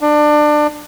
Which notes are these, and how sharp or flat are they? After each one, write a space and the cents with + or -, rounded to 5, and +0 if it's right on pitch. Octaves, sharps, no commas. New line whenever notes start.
D4 +25